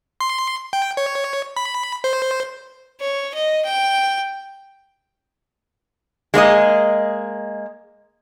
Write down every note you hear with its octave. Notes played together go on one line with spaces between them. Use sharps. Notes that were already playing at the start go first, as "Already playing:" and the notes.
C6
G5
C#5
B5
C5
C#5
D#5
G5
G#3 A#3 D4 D#5